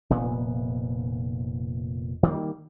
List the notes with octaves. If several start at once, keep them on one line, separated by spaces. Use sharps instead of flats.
F1 A#2 B3
D#3 G3 A#3